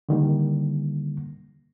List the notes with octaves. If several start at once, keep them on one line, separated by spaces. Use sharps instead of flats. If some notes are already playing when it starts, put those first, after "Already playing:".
D3 D#3 G3 A#3